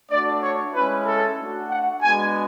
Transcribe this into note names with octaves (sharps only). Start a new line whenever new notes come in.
A3 D4 F#4 D5
C#5
G#3 C#4 E4 B4
A4
A3 D4 F#4
F#5
G#3 B3 D4 F#4 G#5